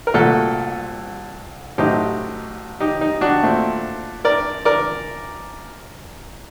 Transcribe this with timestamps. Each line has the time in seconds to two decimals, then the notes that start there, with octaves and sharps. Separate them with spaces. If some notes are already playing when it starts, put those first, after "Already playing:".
0.07 A#4
0.14 C2 A#2 A3 F#4 A4
1.78 A1 A2 F#3 A3 C4 D#4 G4
2.80 D#4 G4
3.01 D#4
3.21 D4 F#4
3.43 A#2 A3 C4
4.25 A#4 D5
4.65 A#4 D5